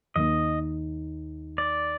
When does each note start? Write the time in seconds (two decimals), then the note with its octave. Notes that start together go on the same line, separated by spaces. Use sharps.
0.16 D#2 D#3 A#3 D#4 D#5
1.58 D5